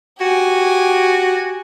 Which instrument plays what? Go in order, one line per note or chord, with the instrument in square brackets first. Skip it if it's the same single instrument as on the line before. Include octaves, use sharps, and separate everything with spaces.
[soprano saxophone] F#4 [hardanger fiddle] G4 G#5